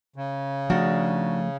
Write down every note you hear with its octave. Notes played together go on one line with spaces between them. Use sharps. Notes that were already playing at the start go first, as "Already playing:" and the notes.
C#3
D#3 F3 A3 D4 F#4